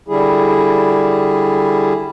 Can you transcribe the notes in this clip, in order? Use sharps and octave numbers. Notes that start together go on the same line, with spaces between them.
D3 G3 E4 G#4